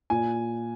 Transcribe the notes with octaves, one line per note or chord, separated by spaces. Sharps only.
A#2 G#5